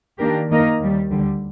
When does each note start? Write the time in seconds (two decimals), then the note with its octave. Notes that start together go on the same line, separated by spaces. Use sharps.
0.19 D#3 A#3 D4 G4 A#4
0.49 D#3 A#3 D#4 A#4 D#5
0.80 D#2 D#3 G3
1.11 D2 D3 G3